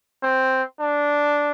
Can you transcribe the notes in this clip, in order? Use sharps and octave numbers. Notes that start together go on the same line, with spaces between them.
C4
D4